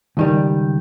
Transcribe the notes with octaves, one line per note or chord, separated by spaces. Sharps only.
C#2 D#3 G3